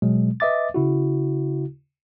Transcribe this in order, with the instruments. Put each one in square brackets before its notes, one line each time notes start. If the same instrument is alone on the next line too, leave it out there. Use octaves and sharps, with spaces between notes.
[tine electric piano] B2 F#3 G#3
B4 D#5 E5 D6 A6
C#3 E4 F#4